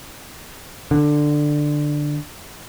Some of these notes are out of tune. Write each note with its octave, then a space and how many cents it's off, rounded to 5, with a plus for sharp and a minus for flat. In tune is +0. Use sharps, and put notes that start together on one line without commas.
D3 +10